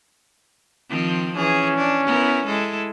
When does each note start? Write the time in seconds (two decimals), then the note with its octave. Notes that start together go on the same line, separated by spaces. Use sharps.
0.89 D#3 F3 C4
1.36 E3 C#4 G#4
1.77 D4
2.06 B3 E4 A#4
2.46 G#3 E4 A4